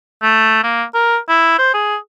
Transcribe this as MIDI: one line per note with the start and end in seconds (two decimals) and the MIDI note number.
0.22 0.63 57
0.63 0.83 58
0.94 1.17 70
1.29 1.58 64
1.59 1.70 72
1.74 1.96 68